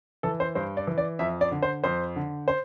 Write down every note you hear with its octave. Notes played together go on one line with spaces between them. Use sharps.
E3 A4
C5
G2 C5
D5
E3
D5
F2 E5
D5
D3
C5
F2 C5
D3
C5